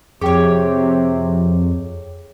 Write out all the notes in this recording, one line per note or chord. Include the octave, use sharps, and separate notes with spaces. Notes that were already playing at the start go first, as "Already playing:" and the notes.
F2 C3 G4 G#4 C#5 G5